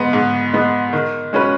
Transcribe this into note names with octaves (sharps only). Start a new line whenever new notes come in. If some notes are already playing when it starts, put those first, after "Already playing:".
Already playing: G#2 G#3 B3
G#2
G#3 B3
D#3
G#3 C#4 F#4 B4